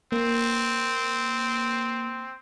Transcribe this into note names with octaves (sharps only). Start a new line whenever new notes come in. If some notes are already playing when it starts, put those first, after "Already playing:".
A#3 C4